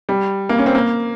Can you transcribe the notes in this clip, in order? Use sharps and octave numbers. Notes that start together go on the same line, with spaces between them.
G3
A#3
C#4
C4
A#3